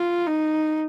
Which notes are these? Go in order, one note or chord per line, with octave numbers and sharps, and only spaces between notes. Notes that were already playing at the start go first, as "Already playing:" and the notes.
Already playing: F4
D#4